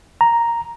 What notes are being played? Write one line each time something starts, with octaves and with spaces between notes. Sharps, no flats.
A#5